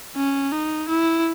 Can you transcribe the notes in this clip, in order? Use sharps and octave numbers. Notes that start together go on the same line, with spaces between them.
C#4
D#4
E4